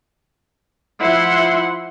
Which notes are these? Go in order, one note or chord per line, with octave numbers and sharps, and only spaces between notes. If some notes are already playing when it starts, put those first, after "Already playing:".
F3 E4 F#5 C6